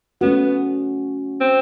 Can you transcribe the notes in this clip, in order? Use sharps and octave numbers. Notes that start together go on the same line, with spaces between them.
A3 B3 C#4 F#4
C4